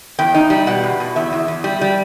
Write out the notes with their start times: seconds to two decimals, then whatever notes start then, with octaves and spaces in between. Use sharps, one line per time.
0.19 E2 G5
0.35 D#4
0.50 G3
0.67 B2 F#5
0.83 E2
1.00 B2
1.16 E2 E5
1.33 E2
1.48 E2
1.64 G3
1.81 G3